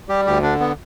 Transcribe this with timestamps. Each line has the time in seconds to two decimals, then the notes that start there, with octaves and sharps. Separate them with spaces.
0.09 G3 G4
0.25 D2 G4
0.42 D3 D4
0.60 B3